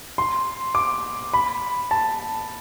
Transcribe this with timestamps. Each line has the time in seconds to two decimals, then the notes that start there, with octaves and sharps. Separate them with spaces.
0.18 C6
0.75 D6
1.33 B5
1.91 A5